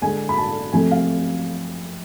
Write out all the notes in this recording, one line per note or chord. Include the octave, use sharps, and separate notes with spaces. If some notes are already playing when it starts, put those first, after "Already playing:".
D3 G#3 G#5
B5
A5
C3 F3 A3 G#5
F5